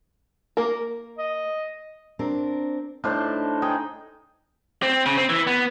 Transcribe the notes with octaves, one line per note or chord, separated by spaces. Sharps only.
A#3 A#4
D#5
C4 D4 A#4
A2 D4 D#4 C5
D#4 G#4 G5
C4
C#3
C4
E3
B3